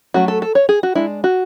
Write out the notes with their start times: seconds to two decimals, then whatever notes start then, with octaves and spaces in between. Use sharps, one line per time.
0.14 F#3 A3 C#4 F#4
0.28 A4
0.42 A4
0.55 C#5
0.69 G#4
0.83 F#4
0.95 G#3 D4 E4
1.24 F#4